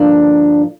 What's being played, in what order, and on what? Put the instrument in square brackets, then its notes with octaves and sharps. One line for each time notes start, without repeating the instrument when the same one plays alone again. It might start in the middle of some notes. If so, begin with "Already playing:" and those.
Already playing: [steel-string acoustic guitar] G2 D3 F3 A#3 D4